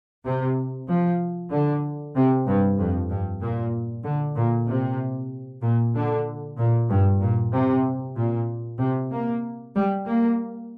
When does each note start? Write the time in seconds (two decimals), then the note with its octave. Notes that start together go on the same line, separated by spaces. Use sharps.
0.25 C3
0.88 F3
1.52 D3
2.15 C3
2.47 G2
2.78 F2
3.10 G2
3.41 A#2
4.05 D3
4.36 A#2
4.68 C3
5.62 A#2
5.95 D3
6.58 A#2
6.89 G2
7.21 A#2
7.52 C3
8.16 A#2
8.79 C3
9.11 A#3
9.75 G3
10.06 A#3